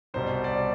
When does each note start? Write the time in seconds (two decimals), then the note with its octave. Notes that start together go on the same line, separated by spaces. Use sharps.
0.14 C2 B2 G3 C5
0.44 D5